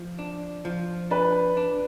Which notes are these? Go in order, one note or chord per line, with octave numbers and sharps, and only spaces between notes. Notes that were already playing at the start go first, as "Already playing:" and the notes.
Already playing: F3
D4
F3
D4 B4
D4